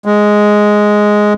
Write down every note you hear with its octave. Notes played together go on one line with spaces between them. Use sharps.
G#3